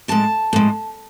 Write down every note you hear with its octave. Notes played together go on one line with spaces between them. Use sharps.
A2 G#3 A5
A2 G#3